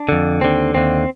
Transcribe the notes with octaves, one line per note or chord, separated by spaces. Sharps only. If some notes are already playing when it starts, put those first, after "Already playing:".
Already playing: D4
F2 D3
D#2 D3 C4
D#2 D3 C4